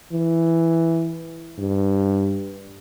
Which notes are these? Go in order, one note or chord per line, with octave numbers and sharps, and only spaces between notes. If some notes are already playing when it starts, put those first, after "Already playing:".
E3
G2